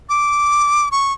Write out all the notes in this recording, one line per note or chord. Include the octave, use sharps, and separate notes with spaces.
D6
C#6